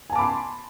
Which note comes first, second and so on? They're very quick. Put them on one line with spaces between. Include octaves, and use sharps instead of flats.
G#5 A5 D6 B5 C6